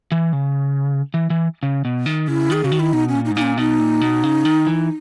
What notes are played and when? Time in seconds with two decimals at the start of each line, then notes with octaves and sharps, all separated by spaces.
0.12 E3
0.33 C#3
1.14 E3
1.30 E3
1.63 C#3
1.85 B2
2.06 D#3
2.28 C#3 E4
2.50 D#3 G#4
2.64 C#3 F#4
2.72 D#3
2.80 E4
2.93 B2 D#4
3.09 C#4
3.15 A#2
3.25 D#4
3.31 G#2
3.35 A#2 D#4
3.42 C#4
3.57 B2 D#4
3.79 A#2
4.01 B2
4.23 C#3
4.45 D#3
4.67 E3